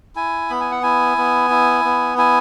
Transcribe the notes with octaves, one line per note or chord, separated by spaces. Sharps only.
E4 G#5
B3 B5
G#5
F#5
E4 G#5
B3
E4
B3
E4 G#5